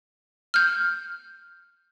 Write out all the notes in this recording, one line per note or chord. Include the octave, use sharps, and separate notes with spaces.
F6 G6